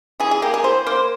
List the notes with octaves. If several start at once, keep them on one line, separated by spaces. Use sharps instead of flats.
E3 G#4
G#4
A#3 G4
G#4
E3 C5
A#3 C5